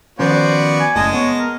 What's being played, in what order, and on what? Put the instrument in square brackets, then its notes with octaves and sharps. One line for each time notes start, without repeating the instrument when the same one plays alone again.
[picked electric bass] D#3 F3 C#4 [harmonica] B3 F#4 D5 [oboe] C5
[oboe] G#5
[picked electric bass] F#1 A2 [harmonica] G#3 D#5 A5
[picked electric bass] B3 [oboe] C#5
[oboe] A#4